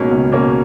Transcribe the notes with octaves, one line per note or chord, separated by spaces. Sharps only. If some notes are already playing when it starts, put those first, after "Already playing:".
Already playing: C#2 B2 A#3 C#4
C#2
B2 A#3 C#4